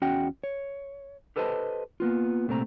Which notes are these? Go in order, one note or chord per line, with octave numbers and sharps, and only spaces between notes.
E2 C#4 F#4 D#5 F#5 G5
C#5
G4 A4 B4 C5 D#5 A5
A#3 B3 F4
C2 A#2 A3 C4 A#5